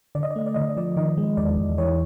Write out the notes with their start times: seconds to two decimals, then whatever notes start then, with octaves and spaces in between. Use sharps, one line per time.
0.15 D3 D5
0.23 D#5
0.31 D5
0.36 A3 D#5
0.46 D5
0.54 D3 D#5
0.62 D5
0.69 D#5
0.77 F3 D5
0.96 D#3 D#5
1.17 G#3
1.37 E2 D5
1.57 E2
1.78 E3 C#5